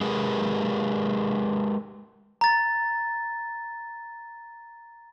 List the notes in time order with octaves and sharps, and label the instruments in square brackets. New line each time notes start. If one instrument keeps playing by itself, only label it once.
[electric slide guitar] G#3 G4 G#4 A#4 B4
[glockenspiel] A#5 A6